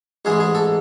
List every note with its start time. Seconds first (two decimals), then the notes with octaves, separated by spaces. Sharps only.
0.25 A1 G#2 E3 G#3 G#4
0.40 G#4
0.55 A4